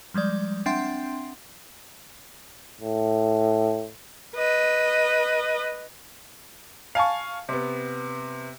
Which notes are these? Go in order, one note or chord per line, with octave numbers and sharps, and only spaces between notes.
F3 G3 G#3 D5
C4 D4 E5 F#5 G5 C6
A2
B4 D#5
F5 G#5 A5 C#6
C3 B3